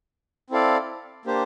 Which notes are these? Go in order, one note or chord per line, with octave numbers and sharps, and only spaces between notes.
C4 E4 A4 D5 F5
A#3 D4 G4 C5